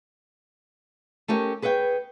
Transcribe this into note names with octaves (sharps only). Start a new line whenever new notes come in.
A3 C#4 G4 A#4
G#4 B4 C#5 E5 G5